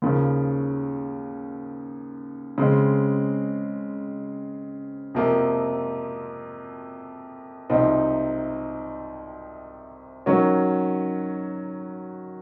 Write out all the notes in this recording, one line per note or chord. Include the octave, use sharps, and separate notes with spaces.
D#2 C#3 F3
C#3 G#3 C4
F2 C3 F3 A#3
C2 C3 F3 C4 D#4
D#3 F#3 C#4 F#4